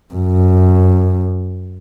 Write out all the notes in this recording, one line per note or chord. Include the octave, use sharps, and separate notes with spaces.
F#2